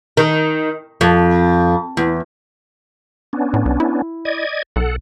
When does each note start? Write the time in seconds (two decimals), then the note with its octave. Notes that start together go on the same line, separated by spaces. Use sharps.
0.17 D#3
1.01 F2
1.97 E2
3.33 B3 C#4 D4
3.54 A2
3.65 C2
3.80 E4
4.25 D5 D#5 G#6
4.76 B1 A4 F#5